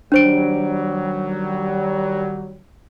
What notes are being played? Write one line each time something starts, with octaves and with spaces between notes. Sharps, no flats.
D#3 F#3 G3 D4 C5 D7